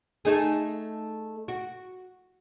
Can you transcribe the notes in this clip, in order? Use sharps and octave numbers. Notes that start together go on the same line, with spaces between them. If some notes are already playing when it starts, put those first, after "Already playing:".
A3 D#4 G#4
F#4